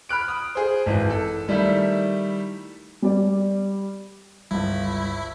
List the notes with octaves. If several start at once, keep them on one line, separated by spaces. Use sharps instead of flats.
B5 F6 F#6 D7
D#6
G#4 C5
G#1 E3
A4
D#3 G3 A3 E4
G3 D5
G1 C#2 E4